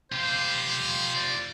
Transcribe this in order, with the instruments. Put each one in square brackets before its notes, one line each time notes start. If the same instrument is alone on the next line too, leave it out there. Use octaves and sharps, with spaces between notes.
[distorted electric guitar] F4 G4 [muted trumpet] C5
[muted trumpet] D5